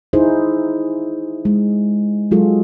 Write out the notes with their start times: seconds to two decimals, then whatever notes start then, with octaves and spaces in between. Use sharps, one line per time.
0.13 D#4 E4 G#4 C5
1.45 G#3
2.31 F#3 G#3 F4 F#4 G#4 A4